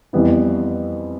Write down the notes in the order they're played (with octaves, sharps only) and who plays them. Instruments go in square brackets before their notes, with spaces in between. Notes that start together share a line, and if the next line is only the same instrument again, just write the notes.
[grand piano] F2 E3 G3 B3 E4